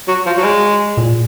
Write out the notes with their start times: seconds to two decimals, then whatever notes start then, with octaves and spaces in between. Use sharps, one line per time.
0.08 F#3
0.26 F3
0.37 F#3
0.44 G#3
0.97 A#2